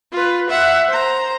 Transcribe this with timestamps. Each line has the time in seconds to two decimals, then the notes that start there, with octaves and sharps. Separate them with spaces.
0.12 F4 B4
0.49 E5 F#5
0.88 C5 A#5